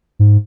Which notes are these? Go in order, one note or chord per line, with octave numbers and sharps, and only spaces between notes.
G#2